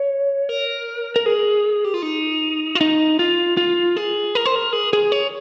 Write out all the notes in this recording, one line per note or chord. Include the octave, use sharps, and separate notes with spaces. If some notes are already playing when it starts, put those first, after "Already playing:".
Already playing: C#5
A#4
A#4
G#4
G4
F4
D#4
F4
D#4
F4
F4
G#4
A#4
C5
A#4
G#4
G#4
C#5